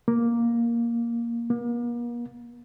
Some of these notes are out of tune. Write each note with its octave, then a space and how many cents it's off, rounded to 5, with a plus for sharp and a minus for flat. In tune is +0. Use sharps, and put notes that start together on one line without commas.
A#3 +5
A#3 +40